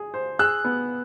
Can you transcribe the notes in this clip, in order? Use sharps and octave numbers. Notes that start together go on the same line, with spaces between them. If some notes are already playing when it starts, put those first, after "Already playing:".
Already playing: G#4
C5
G#4 E6 F#6
B3